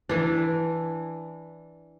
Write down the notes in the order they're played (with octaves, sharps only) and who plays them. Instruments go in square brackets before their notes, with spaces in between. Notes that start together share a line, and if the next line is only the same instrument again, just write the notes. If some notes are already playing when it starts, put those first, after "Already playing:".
[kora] E3 D4